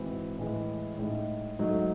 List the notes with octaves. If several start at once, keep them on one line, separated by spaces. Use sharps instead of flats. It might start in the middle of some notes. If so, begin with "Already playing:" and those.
Already playing: G#2 E3 C4 F#4
A2 E3 G#3
A2 G#3 D#4
G#2 F#3 A3 D#4